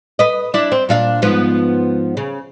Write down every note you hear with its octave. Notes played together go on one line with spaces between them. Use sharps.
B4 D#5
D4 E4
C4
A#2 D4 F5
G#2 F3 B3
C#3